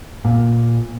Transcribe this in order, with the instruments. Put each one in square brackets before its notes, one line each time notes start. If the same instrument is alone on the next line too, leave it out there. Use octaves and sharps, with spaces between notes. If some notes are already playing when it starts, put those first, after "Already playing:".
[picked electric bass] A#2